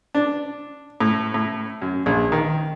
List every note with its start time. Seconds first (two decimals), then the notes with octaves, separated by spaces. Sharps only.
0.15 D4
1.00 A2
1.34 A2
1.82 F#2
2.06 A#1
2.32 D#3